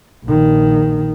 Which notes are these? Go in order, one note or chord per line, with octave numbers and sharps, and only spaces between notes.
A#1 D#3